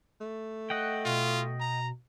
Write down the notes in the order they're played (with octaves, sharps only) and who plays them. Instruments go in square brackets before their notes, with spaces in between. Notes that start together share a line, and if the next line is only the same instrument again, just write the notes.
[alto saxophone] A3
[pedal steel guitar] D#5 F#5 G5 [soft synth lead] F#6
[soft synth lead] B2 [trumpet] F4
[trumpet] A#5